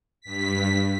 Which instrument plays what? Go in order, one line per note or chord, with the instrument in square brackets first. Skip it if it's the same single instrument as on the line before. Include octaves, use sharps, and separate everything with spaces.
[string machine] G2 B6